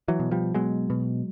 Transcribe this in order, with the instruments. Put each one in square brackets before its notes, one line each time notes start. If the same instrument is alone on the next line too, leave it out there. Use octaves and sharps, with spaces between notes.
[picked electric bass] E3 F#3
B2
F3 G3
B2 F#3 G#3
B2